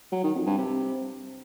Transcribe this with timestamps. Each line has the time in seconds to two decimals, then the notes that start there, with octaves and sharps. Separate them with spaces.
0.12 F#3
0.24 D#3
0.35 F2
0.46 G2
0.58 C3